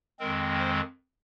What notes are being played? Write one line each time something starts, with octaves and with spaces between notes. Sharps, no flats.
F2 D#3 G#3 C4 A#4
C5